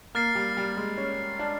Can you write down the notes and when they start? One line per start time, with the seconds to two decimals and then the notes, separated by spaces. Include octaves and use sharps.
0.15 A#3 F6 A6 C7
0.35 G3
0.57 G3
0.77 G#3
0.98 C#4
1.39 D4